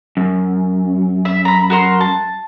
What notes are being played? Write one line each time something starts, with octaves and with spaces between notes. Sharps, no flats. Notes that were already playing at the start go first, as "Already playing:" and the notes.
F#2
E5
A#5 B5
F#4 A#4 C6
A5